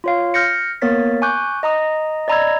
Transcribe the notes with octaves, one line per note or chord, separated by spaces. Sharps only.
F4 C#5 F5
F6 G6 A#6 C#7
A#3 B3 A#4 C#5 A6 B6
G#5 C#6 D6 F#6 G6
D#5 A#5 D#6
D5 D#5 A#5 B5 E6 G#6